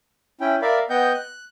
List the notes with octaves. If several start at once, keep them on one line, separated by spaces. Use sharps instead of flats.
C#4 E4 G5
A#4 D5 E5 F5 B5
B3 D#5 F#5 G5 G6
F#6